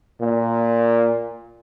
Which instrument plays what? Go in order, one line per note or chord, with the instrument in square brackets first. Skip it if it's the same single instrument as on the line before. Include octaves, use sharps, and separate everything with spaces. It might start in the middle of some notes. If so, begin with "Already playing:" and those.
[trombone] A#2